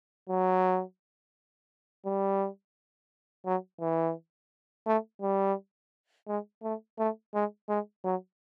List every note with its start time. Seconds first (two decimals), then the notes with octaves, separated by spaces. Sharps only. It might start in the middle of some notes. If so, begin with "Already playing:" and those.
0.29 F#3
2.06 G3
3.46 F#3
3.81 E3
4.86 A3
5.22 G3
6.28 G#3
6.63 A3
6.98 A3
7.34 G#3
7.69 G#3
8.04 F#3